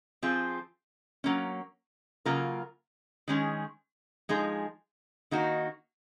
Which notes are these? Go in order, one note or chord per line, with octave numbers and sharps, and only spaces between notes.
F3 C4 F4 G#4
F#3 A#3 C#4
C#3 F#3 A#3 F4 A#4
D#3 G#3 C#4 G#4
F3 G#3 D#4 G#4
D#3 A#3 D#4 F#4